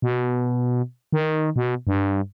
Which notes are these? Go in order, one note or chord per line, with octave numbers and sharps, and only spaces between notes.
B2
D#3
B2
G2